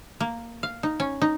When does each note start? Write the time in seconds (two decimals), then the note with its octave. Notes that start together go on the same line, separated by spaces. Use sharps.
0.20 A#3
0.63 F5
0.83 D#4
1.00 C#4
1.22 D#4